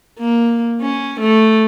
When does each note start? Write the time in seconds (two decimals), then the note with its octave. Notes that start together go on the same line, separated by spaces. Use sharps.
0.19 A#3
0.81 C#4
1.20 A3